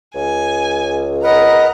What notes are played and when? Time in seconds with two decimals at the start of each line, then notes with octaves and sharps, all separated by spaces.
0.15 C#2 G#5
1.23 A#4 B4 D#5 F#5 A#5